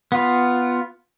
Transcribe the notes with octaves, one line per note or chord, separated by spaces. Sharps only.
B3 F4